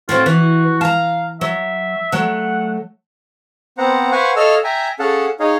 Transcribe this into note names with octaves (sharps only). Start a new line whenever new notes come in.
A2 F#3 C4 F4
E3 F#4
F5 A5 A#5
F#3 E5
F#3 A3 F#5
B3 C4 C5 F#5 A#5
B4 C5 F5 F#5 G#5 C#6
A4 C#5 D#5 F5 E6 F6
E5 G5 G#5 A#5
C#4 G#4 A4 F5 F#5 A5
D#4 G#4 C#5 D#5 F5